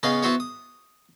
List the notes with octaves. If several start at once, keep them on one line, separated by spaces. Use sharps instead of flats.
C#3 B3 G#4 D#5 F5
B3 E4 F#4 C5 C#5
D#6